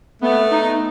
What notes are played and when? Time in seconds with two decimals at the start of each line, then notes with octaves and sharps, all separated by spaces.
0.22 A3 B3
0.51 D#4